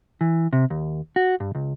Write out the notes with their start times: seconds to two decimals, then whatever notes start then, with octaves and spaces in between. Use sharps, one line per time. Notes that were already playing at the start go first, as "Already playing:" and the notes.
0.21 E3
0.53 C3
0.70 D#2
1.16 F#4
1.40 G2
1.55 C#2